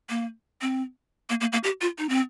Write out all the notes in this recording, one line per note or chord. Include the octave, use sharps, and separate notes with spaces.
A#3
C4
A#3
A#3
A#3
G4
F4
D#4
C4